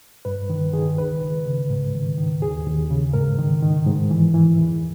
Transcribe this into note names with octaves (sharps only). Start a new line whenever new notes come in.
G2 B4
D#3
D#3 G#4
C#2 B4
C#2
C#3
G#2
D#3
D#3
D#2 G#4
D#2
C#3
G#2 A#4
D#3
D#3
G#2
E3
E3
E2